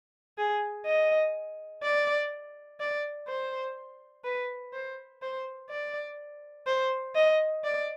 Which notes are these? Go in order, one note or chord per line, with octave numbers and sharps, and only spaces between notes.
G#4
D#5
D5
D5
C5
B4
C5
C5
D5
C5
D#5
D5